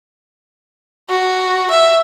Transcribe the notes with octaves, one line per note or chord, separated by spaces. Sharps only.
F#4
E5